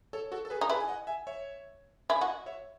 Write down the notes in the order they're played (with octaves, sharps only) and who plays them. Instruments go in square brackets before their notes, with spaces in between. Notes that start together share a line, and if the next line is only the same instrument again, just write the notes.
[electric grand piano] A4 C#5
F#4 A4
A4
G#4 B4
[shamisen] D#4
[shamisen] E4 [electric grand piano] G#4 B4
[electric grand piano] G#5
D#5 F#5
E5 G#5
C#5 E5
[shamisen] E4 [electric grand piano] G#5
[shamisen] F#4 [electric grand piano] D#5 F#5
[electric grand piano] C#5 E5